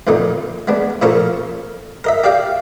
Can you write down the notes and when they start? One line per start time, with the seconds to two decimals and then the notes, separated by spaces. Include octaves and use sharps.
0.07 F2 A#2 D3 D#4
0.68 G#3 B3 D4
1.02 A#2 C#3 F3 A4 A#4 C#6
2.04 A#4 D#5 E5
2.24 G4 D5 F5 G5